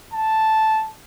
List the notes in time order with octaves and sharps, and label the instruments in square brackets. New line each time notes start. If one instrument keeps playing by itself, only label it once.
[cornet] A5